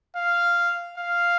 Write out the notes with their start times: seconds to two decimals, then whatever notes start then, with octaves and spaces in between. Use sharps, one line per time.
0.16 F5
0.98 F5